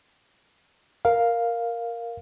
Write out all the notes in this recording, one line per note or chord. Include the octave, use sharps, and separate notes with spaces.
A#4 F5